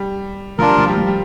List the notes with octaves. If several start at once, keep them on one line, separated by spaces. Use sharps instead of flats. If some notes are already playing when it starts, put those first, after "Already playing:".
Already playing: G3
F3 D4 F4 A#4
G3
F3
G3
F3
G3